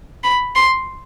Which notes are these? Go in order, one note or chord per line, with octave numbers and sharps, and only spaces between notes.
B5
C6